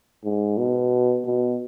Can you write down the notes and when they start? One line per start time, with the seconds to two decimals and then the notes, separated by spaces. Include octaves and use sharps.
0.24 G#2
0.58 B2
1.25 B2